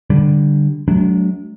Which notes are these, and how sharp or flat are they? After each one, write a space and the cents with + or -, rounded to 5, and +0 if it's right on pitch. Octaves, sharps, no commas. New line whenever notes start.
D3 +0 G3 +0
F#3 +0 A3 -45 D4 -30